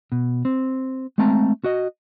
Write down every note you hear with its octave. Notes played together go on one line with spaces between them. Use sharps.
B2
C4
G#3 A3 C4 A5 A#5
F#4 D#5